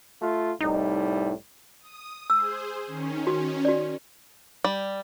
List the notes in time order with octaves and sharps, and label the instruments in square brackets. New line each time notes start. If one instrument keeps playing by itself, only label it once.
[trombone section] A3 F4
[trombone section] C2 A2 G3 [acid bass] D#4
[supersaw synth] D#6
[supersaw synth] G#4 C5 [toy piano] E6
[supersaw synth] D#3 C#4
[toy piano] F#4
F#4 D5
[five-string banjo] G3